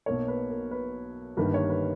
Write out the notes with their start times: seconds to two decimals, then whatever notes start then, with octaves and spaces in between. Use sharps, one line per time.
0.06 B1 B2 A#3 C#5
0.28 B4
0.50 A#4
0.71 B4
1.37 G1 G2 D#3 A#3 B4
1.54 C#5
1.70 B4